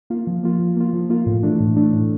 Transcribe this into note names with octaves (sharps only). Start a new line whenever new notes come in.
A#3 F4
F3
A#3 F4
F3
A#3 F4
F3
A#3 F4
A2
E3 A3 D4
A2
E3 A3 D4
A2